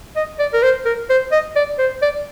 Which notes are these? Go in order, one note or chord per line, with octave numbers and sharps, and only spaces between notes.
D#5
D5
A#4
C5
A#4
C5
D#5
D5
C5
D5